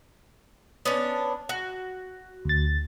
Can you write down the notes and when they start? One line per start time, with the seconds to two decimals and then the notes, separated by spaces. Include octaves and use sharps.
0.85 B3 C#4 D4
1.49 F#4
2.45 D2 A6